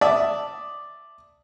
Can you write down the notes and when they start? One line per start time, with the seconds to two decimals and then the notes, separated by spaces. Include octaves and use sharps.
0.01 D5 E5 A5 D#6